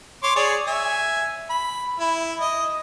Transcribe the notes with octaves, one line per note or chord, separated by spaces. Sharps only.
C#5 C6 D6
G#4 C#5 D5
E5 G#5
B5
E4
D#5